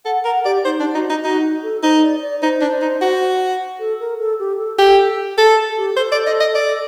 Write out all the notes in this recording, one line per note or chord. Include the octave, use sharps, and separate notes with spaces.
A4 F#5
A#4 F#5
G4 D5
D#4 C5
D4
D#4 F#4
D#4
D#4 F#4
A4
D#4 C5
D5
D5
D#4 C5
D4
D#4
F#4
A4
A#4
A4
G4
A4
G4 A4
A4
A4
G4
A4 C5
D5
D#5
D#5
D5